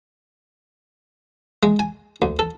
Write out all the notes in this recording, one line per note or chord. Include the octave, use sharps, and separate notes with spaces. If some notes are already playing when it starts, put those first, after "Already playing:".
G#3
G#5
D2
A4